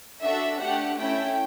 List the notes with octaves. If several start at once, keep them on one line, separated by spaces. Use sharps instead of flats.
D4 F#4 A4 E5
A3 D4 G4 F#5
A3 C#4 E4 G5